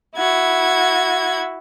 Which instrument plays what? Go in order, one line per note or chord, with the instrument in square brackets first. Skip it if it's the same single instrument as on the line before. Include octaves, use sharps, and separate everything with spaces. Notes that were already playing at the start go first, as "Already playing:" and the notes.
[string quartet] E4 F#4 G#6